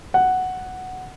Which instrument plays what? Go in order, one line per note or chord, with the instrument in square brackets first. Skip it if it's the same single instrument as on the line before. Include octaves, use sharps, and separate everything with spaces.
[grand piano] F#5